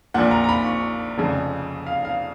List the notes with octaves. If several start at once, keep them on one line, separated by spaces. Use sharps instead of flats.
A#1 A#2 F#5
A#5
A#5
B5
C#6
F1 F2 C#3
F5
F5